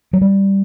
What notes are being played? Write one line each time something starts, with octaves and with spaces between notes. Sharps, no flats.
F#3
G3